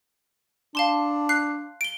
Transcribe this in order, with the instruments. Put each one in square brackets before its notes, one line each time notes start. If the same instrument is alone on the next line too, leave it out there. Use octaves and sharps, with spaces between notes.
[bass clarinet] D4 [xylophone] F5 A5 C6
[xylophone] F#6 C7
D7 G7